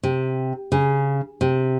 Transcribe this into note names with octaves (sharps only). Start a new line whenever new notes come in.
C3
C#3
C3